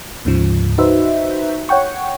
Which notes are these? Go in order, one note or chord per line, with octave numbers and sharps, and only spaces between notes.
D2 G#2 C#3 F3
D#4 F#4 B4 C5 E5
C#5 F#5 G5 C#6